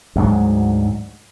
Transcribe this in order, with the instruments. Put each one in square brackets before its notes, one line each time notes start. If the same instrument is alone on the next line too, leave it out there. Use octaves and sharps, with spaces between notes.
[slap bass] D2 G#2 F#3